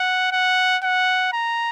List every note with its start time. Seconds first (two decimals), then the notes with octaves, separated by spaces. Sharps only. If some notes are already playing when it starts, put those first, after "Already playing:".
Already playing: F#5
0.32 F#5
0.83 F#5
1.33 A#5